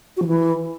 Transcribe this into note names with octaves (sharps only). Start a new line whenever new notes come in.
F#4
F3
E3